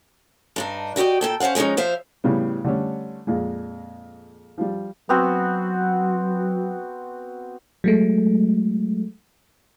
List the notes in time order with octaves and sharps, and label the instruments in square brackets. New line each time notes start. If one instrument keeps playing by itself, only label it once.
[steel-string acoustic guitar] G2 D4 D#4
E4 F#4 G4 D5 D#5
A#2 A4 G5
C#4 C5 D5 F5 F#5
F3 G#3 A3 C#4 D#4
F3 C5 E5 F5
[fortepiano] A2 C#3 G3 B3
D3 G3 A3 C#4
F2 A#2 G#3
F3 G3
[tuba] F#3 [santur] B3 C4 F#4
[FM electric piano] F#3 G#3 A3